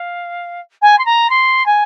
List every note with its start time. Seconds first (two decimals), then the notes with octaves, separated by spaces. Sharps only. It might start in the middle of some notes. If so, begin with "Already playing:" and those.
Already playing: F5
0.81 G#5
0.98 C6
1.05 A#5
1.30 C6
1.66 G#5